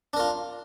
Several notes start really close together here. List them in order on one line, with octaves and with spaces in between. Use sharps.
D4 A#4 F4